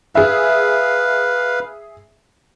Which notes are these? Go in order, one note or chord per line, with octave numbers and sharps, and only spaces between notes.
G#4 B4 E5 F5